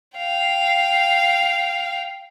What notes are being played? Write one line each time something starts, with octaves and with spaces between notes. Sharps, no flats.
F5 G5